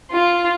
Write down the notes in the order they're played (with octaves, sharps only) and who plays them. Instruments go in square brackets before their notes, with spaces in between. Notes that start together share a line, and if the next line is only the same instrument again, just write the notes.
[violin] F4